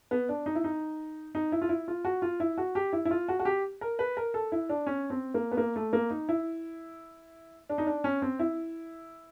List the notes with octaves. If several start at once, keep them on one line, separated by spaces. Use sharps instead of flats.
B3
D4
D#4
E4
D#4
D#4
E4
F4
E4
F4
F#4
F4
E4
F#4
G4
E4
E4
F4
F#4
F#4
G4
A#4
B4
A#4
A4
E4
D4
C#4
C4
A#3
B3
A#3
A3
A#3
D#4
E4
D4
D#4
D4
C#4
C4
E4